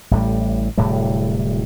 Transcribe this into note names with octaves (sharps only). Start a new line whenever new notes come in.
A1 A2 G3
D1 A2 C3 G3